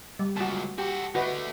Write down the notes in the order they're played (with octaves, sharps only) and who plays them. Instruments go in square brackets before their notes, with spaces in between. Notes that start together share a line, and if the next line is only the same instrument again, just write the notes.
[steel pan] G3
[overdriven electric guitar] C#2 A#2 [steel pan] F#4 A5
[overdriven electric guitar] F#4 A4 [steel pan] G4
[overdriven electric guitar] D3 A3 [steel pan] F#4 B4 D#5